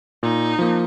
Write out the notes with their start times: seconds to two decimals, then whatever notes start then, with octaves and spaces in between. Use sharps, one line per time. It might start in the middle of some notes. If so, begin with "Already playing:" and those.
0.23 A#2 D#4
0.59 F3 A#3